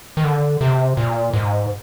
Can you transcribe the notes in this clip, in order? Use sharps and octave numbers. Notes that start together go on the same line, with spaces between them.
D#3
D3
C3
A#2
G#2